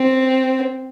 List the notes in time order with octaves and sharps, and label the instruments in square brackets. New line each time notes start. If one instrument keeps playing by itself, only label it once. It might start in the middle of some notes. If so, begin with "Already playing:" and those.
Already playing: [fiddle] C4